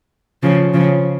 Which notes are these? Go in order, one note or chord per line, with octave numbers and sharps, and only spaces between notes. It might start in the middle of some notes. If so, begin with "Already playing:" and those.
C#3 F3
C#3 F3